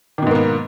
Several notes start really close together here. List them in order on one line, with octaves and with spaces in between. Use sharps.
D#3 B2 G#2 A#3 B3